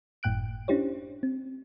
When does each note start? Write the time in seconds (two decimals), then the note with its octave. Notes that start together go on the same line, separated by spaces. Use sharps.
0.23 G1 F#2 A2 G5 F#6 D7
0.68 C#4 D4 E4 G4 C5 C#5
1.23 C4